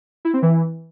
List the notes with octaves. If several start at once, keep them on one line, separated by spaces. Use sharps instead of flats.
E4
C4
E3